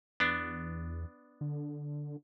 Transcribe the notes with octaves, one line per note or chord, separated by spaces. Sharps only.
E2 B3 D4
D3